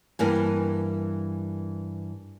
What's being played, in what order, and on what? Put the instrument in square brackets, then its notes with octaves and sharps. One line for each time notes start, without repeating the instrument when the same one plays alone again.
[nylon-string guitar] G2 E3 A#3 G#5